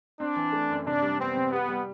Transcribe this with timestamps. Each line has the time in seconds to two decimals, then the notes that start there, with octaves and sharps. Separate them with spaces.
0.19 C4 D4
0.37 E3
0.53 A3
0.70 F#2
0.86 C3 D4
1.02 G3
1.19 B3 C4
1.36 C3
1.52 B3 G4
1.69 G3